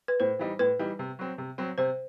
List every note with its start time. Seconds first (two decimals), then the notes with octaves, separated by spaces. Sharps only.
0.08 B4
0.20 A2 C5
0.39 E3 G3 D#4
0.59 A2 B4
0.79 E3 G3 D#4
0.99 C3
1.19 F#3 C4
1.38 C3
1.58 F#3 C4
1.78 C3 C5